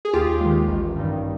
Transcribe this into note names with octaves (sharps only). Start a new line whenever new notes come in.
G#4
D#2 F4 G4
D#3 G#3
A1
G2 D#3 G3